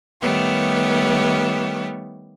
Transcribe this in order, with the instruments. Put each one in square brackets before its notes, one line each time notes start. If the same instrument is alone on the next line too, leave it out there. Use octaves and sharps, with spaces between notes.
[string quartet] D#3 G3 A3 B3 G4 C#5